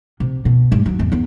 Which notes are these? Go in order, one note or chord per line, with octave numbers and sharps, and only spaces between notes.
C3
B2
G2 G#3
D#2 F#3
G#1 E2
E2 B3